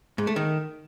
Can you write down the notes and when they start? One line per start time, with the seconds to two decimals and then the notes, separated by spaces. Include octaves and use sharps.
0.18 G#2
0.27 A3
0.36 D#3